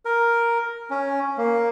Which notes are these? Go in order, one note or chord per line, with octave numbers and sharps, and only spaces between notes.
A#4
C#4
A#3